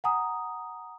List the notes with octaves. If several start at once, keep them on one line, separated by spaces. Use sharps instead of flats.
F#5 G#5 A#5 D#6